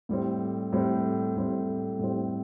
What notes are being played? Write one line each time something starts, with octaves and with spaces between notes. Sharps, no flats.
A2 G3 C4
A2 G3 C4
A2 G3 C4
A2 G3 C4